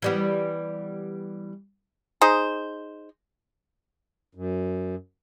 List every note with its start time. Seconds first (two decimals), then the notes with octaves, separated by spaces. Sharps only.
0.02 E3 G3 B3
2.21 D#4 G#4 C5
4.35 F#2